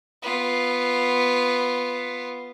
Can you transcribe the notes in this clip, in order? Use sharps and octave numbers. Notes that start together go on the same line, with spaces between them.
B3 F4